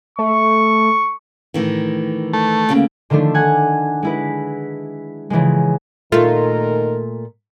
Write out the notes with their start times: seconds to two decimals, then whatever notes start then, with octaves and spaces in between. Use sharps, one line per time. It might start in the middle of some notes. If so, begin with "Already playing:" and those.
0.19 A3 C#6
1.54 A2 D#3 E3
2.33 A3
2.69 D2 C#3 A#3
3.10 D3 D#3 F3 A3 D4
3.34 F#5 G#5 F#6 G#6
4.03 G#3 E4 B4
5.30 C#3 E3 F3 G#3
6.12 A#2 D#3 A3 D#4 F4 A#4